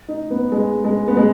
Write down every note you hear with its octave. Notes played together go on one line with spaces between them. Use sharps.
D#4
B3
G#3
G#3
B3
G#3